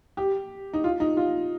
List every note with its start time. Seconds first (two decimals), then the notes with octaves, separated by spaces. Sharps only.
0.17 G4
0.73 D#4
0.84 F4
1.00 D#4
1.17 F4